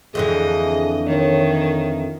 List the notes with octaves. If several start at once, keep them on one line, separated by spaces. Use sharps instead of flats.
F2 D3 E3 G#4 D#5
D#3 C#5